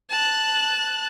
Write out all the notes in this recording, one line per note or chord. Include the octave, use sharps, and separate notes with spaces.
A5 F#6